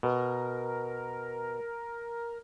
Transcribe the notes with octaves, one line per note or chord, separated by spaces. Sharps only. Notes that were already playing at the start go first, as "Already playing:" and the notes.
B2 A#4